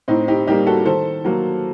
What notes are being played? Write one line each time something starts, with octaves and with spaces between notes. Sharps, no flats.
A2 C4 D#4
D#4 G4
G3 A#3 D#4 G4
F#4 A4
D#3 A4 C5
F#3 A#3